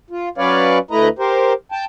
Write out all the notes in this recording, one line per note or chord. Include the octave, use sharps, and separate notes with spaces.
F4
F#3 C#4 B4 C#5 D5 F5
D2 A3 E4 B4 D#5 A#5
G4 A#4 C5
G5 A5